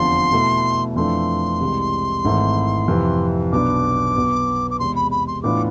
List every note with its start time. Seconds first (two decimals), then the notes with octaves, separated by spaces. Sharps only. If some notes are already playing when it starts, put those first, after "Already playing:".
Already playing: F1 E2 D3 F3 C6
0.32 B2 A3 E4
0.96 F2 E3 A3 D4 F4 C6
1.60 C2 C3 E3 G#3
2.24 G#1 G#2 E3 A3 E4
2.88 F2 C3 E3
3.52 B1 B2 B3 D4 D6
4.15 B1 B2 B3
4.71 D6
4.79 E2 C3 G#3 C6
4.96 B5
5.11 B5
5.27 C6
5.43 A2 E3 B3 D4 F4 D6